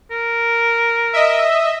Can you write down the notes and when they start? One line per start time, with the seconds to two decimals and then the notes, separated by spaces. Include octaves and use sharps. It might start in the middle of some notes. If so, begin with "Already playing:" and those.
0.11 A#4
1.13 D#5 E5